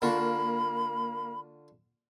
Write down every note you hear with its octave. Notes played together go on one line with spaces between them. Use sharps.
D3 A#3 F4 F#4 B5